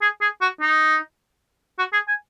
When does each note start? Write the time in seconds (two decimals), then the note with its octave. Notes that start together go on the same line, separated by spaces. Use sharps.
0.02 G#4
0.21 G#4
0.41 F#4
0.61 D#4
1.78 F#4
1.93 G#4
2.08 G#5